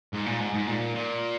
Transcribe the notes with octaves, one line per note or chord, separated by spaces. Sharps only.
G#2
A#2
G#2
G#2
A#2
A#2